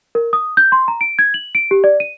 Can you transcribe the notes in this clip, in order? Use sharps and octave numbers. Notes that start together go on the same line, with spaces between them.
A#4
D#6
G6
C6
A#5
D7
G#6
F#7
D7
G4
D5
D#7